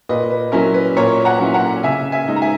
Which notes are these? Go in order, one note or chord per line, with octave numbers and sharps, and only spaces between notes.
A#2 B4 D#5
B4
F#3 C#4 E4 A#4
B4
A#2 A#4 C#5
F#5 A#5
F#3 C#4 E4
F#5 A#5
C#3 E5 G#5
E5 G#5
G#3 D#4
A#5
E5 G#5